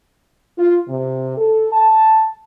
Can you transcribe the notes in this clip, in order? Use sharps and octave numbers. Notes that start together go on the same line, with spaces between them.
F4
C3
A4
A5